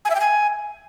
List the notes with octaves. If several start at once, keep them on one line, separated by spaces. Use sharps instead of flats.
G#5
E5
G5
G#5